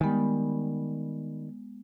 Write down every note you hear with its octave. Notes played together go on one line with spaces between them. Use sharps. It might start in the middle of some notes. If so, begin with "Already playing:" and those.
D#3 G3 G#3 B3